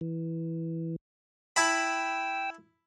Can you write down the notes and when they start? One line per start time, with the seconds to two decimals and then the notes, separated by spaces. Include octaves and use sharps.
0.01 E3
1.56 E4 G5 A5 B5 E6